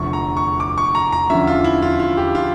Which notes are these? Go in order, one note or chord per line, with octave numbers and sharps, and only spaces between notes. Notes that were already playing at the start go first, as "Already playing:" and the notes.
Already playing: F1 E2 D3 F3 C#6
A#5
C#6
D6
C#6
A#5
A#5
E2 D3 F3 C#4 E5
F4
E4
F4
F4
G4
F4